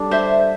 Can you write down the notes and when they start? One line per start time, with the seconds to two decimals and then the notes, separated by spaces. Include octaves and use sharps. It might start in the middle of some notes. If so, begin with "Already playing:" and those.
Already playing: G3 D4 A4
0.11 C5 E5